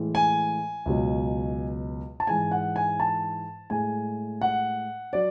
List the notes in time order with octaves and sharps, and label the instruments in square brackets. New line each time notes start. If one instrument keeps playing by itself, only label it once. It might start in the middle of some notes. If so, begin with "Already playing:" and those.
Already playing: [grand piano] A2 E3 G#3
G#5
C#2 B2 F#3
A5
G#2 E3 G#3 G#5
F#5
G#5
A5
A2 G#3 G#5
F#5
F#3 D5